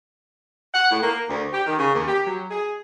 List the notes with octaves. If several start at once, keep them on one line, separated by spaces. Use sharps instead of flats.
F#5
A2
A#3
D2
G4
D#3
C#3
D#2
G4
F#3
G#4